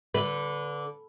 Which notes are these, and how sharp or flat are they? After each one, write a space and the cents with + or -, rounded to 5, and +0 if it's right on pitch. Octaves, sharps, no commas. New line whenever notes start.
D3 -15 B4 +0